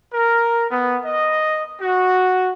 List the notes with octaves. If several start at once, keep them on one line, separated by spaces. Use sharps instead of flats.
A#4
B3
D#5
F#4